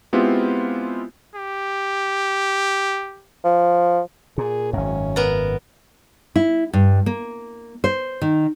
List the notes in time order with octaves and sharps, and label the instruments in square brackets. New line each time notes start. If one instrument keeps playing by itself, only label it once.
[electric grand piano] G#3 B3 C4 E4 F4 G4
[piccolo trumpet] G4
[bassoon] F3
[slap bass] A#2 [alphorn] G#4
[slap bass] G#1 F#2 [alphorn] C#4
[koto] B3 A#4
[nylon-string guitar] E4
G2
A#3
C5
D#3